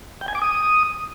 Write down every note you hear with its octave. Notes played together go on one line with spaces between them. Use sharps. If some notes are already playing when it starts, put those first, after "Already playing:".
G5
G#5
D6
D#6